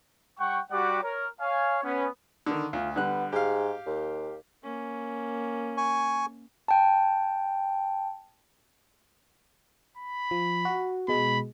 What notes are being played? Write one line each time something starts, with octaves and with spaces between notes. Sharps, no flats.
G3 F#5 G5 C#6
G3 F#4 G4 D5 F#5 D6
A#4 C#5
C#5 F5 G#5
B3 C#4
D3 D#3
D2 F4
D3 G3 B3 F#6
G#2 G4 F5
D#2
A#3 C#4
G#5 C#6
G5 A5
B5
F3
F#4
B2 G#3 B5